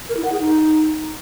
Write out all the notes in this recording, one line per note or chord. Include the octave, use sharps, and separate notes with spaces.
A#4
E4
F#5
G#4
D#4